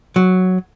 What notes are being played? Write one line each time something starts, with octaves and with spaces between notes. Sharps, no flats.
F#3